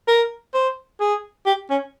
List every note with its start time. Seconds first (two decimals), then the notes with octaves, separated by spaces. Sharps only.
0.08 A#4
0.54 C5
1.00 G#4
1.46 G4
1.70 C#4